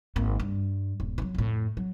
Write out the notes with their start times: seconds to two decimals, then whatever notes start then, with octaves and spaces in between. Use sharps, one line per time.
0.16 G#1 A#3
0.40 G2
1.00 D#1
1.18 E3 F#3
1.35 F2 A2
1.77 F#3